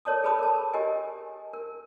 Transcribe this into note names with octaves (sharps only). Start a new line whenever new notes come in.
A4 A#4 C#5 D5 A5 D#6
G#4 A4 B4 A5 B5 D#6
A#4 A5
G4 A#4 D#5 G#5
A#4